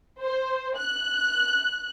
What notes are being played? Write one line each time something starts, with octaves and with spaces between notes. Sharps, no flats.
C5
F#6